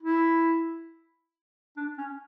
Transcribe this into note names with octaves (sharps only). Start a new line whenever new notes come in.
E4
D4
C#4